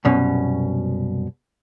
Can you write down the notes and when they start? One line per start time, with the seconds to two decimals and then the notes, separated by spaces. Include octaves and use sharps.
0.05 C2 F#2 B2 C#4